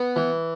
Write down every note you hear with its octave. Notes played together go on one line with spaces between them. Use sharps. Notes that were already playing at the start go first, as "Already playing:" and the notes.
Already playing: B3
E3